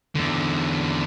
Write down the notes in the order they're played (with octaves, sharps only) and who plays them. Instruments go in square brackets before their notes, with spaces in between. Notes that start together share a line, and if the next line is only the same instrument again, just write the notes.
[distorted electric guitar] E2 D3